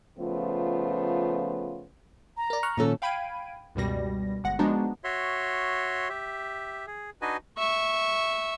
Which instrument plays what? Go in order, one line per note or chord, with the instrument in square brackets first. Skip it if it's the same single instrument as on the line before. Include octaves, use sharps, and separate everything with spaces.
[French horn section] C#3 F3 A3 B3 F4
[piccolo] A#5
[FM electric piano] A#4 D5
C#6 F6 F#6
[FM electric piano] A#2 D#3 [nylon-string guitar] F3 C#4 A4
[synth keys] F5 G5 B5 G#6 D7 D#7
C#2 F#2 B2 G3 A#6
G1 G#3 F#5 A#6
F3 G#3 B3 D4 D#4 F#4
[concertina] F#4 C#5 E5 C6
G4 E5
G#4
D4 D#4 F#4 B4 D#5 G#5
[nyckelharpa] E5 C#6